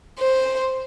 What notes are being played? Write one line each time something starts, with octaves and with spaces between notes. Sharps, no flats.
C5